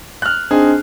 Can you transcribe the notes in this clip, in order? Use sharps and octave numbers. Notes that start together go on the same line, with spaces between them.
F6 F#6
C4 D4 D#4 G#4